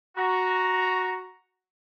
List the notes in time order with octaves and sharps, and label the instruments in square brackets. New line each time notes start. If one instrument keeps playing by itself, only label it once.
[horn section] F#4 [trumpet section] A#5